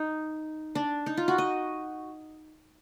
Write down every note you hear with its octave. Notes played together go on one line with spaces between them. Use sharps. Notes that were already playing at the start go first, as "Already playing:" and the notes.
Already playing: D#4
D4
D#4
F4
F#4
D#5